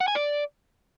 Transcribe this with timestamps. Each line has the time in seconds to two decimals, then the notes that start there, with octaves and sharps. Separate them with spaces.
0.01 F#5
0.08 G#5
0.15 D5